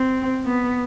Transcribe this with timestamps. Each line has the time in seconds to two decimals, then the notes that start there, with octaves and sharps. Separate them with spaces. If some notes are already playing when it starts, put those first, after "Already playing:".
Already playing: C4
0.46 B3